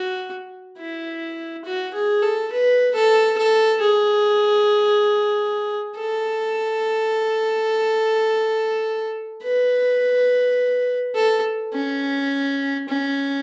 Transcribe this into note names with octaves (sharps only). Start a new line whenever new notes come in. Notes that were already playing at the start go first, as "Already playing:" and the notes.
Already playing: F#4
E4
F#4
G#4
A4
B4
A4
A4
G#4
A4
B4
A4
C#4
C#4